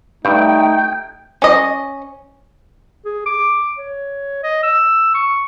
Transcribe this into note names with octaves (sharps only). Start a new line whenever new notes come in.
G2 A3 D#4 G5
C#4 D#5
G#4
D6
C#5
D#5
E6
C#6